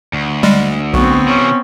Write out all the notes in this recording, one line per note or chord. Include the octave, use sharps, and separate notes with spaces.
D2
G3 G#3
B1 B3 C4 F#4
C3 E3 C#4